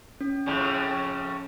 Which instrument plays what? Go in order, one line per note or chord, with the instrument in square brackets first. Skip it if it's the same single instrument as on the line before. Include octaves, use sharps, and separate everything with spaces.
[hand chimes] C#4
[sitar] F2 A2 C#3